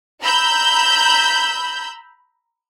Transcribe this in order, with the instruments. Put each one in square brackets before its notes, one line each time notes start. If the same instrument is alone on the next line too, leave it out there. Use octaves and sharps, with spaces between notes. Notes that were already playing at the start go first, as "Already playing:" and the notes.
[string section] A#5 B5 E6 G6